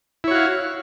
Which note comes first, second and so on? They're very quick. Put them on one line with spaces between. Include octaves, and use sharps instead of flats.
E4 C#5 F#4 F5